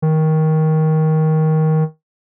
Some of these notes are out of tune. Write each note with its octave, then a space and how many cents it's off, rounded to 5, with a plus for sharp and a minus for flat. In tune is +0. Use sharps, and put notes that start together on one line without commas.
D#3 +15